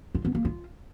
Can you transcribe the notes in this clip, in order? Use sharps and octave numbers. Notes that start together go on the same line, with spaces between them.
F4
B3
A#3
F4